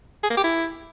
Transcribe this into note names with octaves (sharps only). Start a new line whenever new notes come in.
G#4
A#3
G4
E4